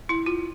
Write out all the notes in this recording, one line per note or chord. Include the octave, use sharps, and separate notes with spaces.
E4
F4